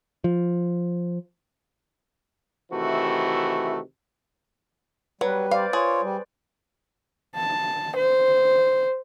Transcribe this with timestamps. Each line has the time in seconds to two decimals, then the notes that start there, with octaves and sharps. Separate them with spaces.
0.24 F3
2.72 C3 D#3 E3 A3 F#4
5.21 F#3 G3 B4
5.51 C5 D5 F5
5.73 F4 G#4 C#5
6.02 G3
7.36 A5
7.96 C5